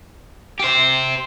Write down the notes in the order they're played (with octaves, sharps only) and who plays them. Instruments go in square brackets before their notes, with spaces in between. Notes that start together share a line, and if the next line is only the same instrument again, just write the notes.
[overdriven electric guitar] G4 C5